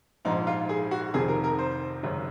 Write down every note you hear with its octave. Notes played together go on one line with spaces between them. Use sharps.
A#1 G#2 F3 D#4
F4
G#4
F#4
F1 F2 C3 D#3 G#4
A#4
A#4
C5
G#1 F#2 C#3